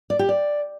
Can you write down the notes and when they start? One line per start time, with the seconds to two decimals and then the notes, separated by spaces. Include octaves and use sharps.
0.10 D5
0.19 G4
0.29 D5